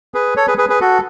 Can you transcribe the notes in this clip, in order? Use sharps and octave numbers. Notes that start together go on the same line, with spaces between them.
G#4 B4
A4 C#5
G#4 B4
G#4 B4
G#4 B4
F#4 A4